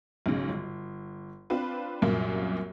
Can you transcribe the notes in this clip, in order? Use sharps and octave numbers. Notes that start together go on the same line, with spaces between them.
B1 G#2 C#3
G1
C4 D4 F4 B4
C2 F#2 A#2 A#3